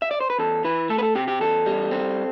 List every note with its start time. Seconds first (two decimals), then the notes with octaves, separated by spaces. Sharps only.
0.02 E5
0.11 D5
0.21 C5
0.30 B4
0.39 E2 A4
0.64 E3 B4
0.89 A3 A4
0.99 B4
1.03 A4
1.15 C3 G4
1.28 G4
1.41 E2 A4
1.66 G3
1.91 C4